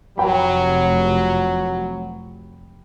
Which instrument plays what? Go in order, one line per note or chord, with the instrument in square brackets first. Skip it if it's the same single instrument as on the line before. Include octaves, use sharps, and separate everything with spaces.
[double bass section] F1 [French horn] F#3 [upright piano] G5 B5